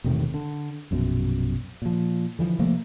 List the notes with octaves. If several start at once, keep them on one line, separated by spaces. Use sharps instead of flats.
E1 A2 C3 D#3
D3
A#1 F#2 B2
A#2 F3
D3 E3 F3
C3 F3 A3 A#3